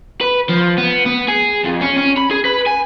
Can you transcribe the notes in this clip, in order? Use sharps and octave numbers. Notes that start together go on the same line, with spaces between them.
B4
F3
B3
B3
G#4
F2
C#4
C#4
B5
G#4
B4
G#5